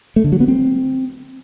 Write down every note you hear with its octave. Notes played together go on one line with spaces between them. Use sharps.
A3
D3
F#3
B3
C4